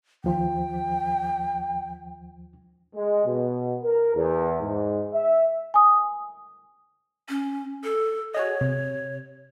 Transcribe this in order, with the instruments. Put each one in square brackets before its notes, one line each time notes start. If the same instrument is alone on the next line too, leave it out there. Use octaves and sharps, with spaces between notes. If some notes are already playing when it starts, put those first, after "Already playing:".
[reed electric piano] D#2 F3 C5 [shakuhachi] G5
[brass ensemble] G#3
B2
A#4
E2
G#2
E5
[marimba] G#5 D#6
[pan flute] C#4
A4
[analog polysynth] F#4 G#4 D#5 [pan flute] C#5
[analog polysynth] C3